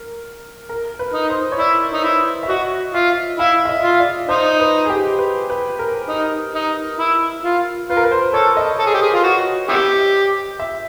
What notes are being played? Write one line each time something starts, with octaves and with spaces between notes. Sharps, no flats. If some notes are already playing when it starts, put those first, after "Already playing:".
Already playing: A#4
A#4
B4
D#4
C5
C#5
E4 D5
D#4
E4
E5
F#4 D#5
F4 E5
E4 F5
E5
D#5
F4
D5
D#4 C5
B4
G#4
G4
B4
B4
A#4
D#4
D#4
E4
F4
F4 B4
A#4
B4
C5
A4 C#5
D#5
A4
G#4
G4
G#4
F4
F#4
B3 E4 G4
E5